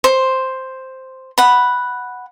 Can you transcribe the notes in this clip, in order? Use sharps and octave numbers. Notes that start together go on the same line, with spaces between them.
C5
F#5 B5